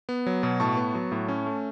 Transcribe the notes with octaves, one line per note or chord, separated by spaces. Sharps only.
B3
F#3
B2
A2 A5 C#6
B3
F#3
A2
C#4
A3